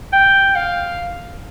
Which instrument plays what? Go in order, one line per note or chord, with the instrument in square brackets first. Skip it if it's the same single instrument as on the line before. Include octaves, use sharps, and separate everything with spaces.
[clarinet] G5
F5